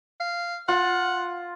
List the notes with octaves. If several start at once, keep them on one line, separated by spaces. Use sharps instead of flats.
F5
F4 F#5